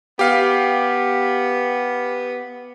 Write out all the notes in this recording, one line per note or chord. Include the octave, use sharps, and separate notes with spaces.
B3 G4 F5